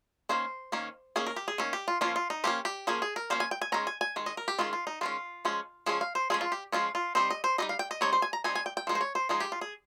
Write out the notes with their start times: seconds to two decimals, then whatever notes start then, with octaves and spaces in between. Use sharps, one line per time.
0.29 D#3 A#3 C#4 C5
0.72 D#3 A#3 C#4
1.16 D#3 A#3 C#4 G#4
1.26 A#4
1.36 G4
1.48 G#4
1.58 D#3 A#3 C#4
1.73 G4
1.88 F4
2.01 F3 A#3 C#4 F4
2.16 F4
2.30 D#4
2.44 F3 A#3 C#4 G4
2.65 G4
2.87 F3 A#3 C#4 G#4
3.02 G#4
3.16 A#4
3.30 F3 A#3 C#4 C5
3.40 G#5
3.51 G5
3.62 G#5
3.72 D#3 G#3 C#4 A#5
3.87 G#5
4.01 G#5
4.16 D#3 G#3
4.26 D#5
4.37 A#4
4.48 G4
4.59 D#3 G#3 C#4 F4
4.73 F4
4.87 D#4
5.01 D#3 G#3 C#4 F4
5.45 F3 G#3 C#4
5.86 F3 G#3 C#4 G#4
6.01 F5
6.15 C5
6.30 F3 G#3 C#4 G#4
6.41 F4
6.52 G4
6.72 F3 G#3 C#4 F4
6.95 F4
7.15 G3 C4 D#4 C5
7.30 D#5
7.44 C5
7.58 G3 C4 D#4 D#5
7.69 F5
7.79 G5
7.91 D#5
8.01 G3 C4 D#4 C#5
8.13 C5
8.22 G#5
8.33 A#5
8.44 G3 C4 D#4 G#5
8.55 G#5
8.66 G5
8.77 G5
8.87 F3 G#3 D#4
8.95 C5
9.01 C#5
9.15 C5
9.29 F3 G#3 D#4 G#4
9.40 G4
9.52 F4
9.61 G#4